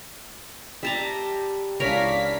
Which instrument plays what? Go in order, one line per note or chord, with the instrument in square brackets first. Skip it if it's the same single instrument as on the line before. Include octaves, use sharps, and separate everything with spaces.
[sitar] G3 [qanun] E5 A5 A#5
[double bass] C#2 D4 [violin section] E4 F5 B6 [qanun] A#4 C#5 G#5